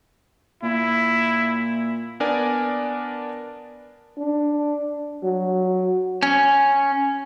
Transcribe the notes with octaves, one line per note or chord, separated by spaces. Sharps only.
A#2 E4
B3 D4 A#4 D5 G#5
D4
F#3
C#4